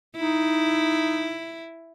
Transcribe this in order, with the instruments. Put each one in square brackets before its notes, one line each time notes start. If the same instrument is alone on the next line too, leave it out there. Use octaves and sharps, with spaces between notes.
[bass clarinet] D#4 [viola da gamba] E4